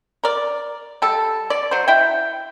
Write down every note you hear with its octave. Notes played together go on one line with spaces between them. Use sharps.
A#4 D5
G3 A4
D5
F#3 C5
E4 G5